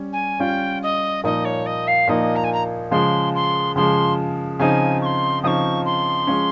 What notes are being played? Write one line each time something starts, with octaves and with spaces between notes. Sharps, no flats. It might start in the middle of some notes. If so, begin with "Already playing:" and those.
Already playing: G3 C#4
G#5
G3 C#4 F4 G5
D#5
A#2 F3 A#3 D#4 D#5
C#5
D#5
F5
A#2 F3 A#3 D#4 D#5
A#5
G#5
A#5
C#3 F3 G#3 C6
C6
C#3 F3 G#3 C6
C#3 F3 C4 D#4 G#5
C#6
C6
C#3 F3 C4 D#4 C#6 D#6
C6
F3 G#3 C#4